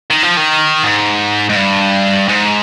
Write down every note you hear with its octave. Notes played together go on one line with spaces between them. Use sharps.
D#3
F3
D#3
G#2
G#2
G2
G#2